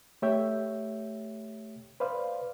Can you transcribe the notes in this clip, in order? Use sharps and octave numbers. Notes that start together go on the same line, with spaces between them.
A3 G4 C#5 E5 G5
B4 C5 D5 F5